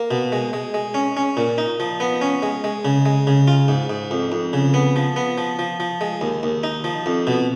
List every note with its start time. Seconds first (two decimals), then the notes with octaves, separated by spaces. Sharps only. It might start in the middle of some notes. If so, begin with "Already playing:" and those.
Already playing: A#3
0.11 B2
0.32 G#3
0.53 G#3
0.74 G#3
0.94 C#4
1.17 C#4
1.37 A#2
1.58 D#4
1.80 F3
2.00 B3
2.22 C#4
2.43 G#3
2.64 G#3
2.85 C#3
3.06 G#3
3.27 C#3
3.48 F4
3.68 G#2
3.90 G#2
4.11 F2
4.32 F2
4.53 C#3
4.74 B3
4.96 F3
5.16 B3
5.38 F3
5.59 F3
5.80 F3
6.01 G#3
6.21 D#2
6.43 D#2
6.63 D#4
6.84 F3
7.06 F2
7.27 B2